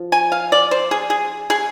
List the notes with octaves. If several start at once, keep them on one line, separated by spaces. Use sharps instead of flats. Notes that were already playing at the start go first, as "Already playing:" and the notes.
Already playing: F3
G#5
F5
D5
C5
G#4
G#4
G#4